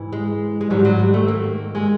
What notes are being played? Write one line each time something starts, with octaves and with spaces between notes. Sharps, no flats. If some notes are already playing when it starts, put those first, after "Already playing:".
Already playing: G#2 E3
G#3
G#3
G#2 D#3 F#3 G3
F#3
G3
A3
A#3
G#3